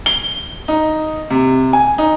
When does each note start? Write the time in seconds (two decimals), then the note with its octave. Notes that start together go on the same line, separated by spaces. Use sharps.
0.06 G7
0.68 D#4
1.30 C3
1.73 G#5
1.98 D#4